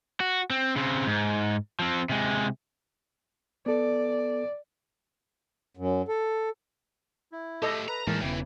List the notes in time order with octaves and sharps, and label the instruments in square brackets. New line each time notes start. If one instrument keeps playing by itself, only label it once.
[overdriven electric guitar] F#4
C4
C#3 C4
G#2
F3 C4
C3 G#3
[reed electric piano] B3 A4 [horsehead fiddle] D5
[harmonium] F#2
A4
[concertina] E4
[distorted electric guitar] A3 G4 [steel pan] A4 D#5
[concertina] B4 [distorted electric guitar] A#5
[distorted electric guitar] D#2 [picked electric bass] A2 E3 G#3 [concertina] A#4 A5
[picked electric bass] E1 C#3 B3 [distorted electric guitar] E3 [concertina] G5